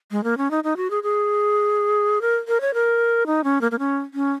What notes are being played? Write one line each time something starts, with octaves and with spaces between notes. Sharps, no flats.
G#3
A#3
C#4
D#4
D#4
F#4
G#4
G#4
A#4
A#4
C#5
A#4
D#4
C#4
A#3
A#3
C#4
C#4